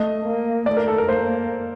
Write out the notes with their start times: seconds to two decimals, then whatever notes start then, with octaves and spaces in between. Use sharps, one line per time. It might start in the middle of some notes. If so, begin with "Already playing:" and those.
Already playing: A3 D#5
0.25 A#3
0.66 A3 D5
0.77 A#4
0.88 A4
0.98 A#4
1.08 A#3 C5